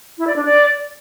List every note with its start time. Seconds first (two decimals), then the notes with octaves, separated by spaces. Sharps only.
0.18 E4
0.27 D5
0.36 D4
0.45 D5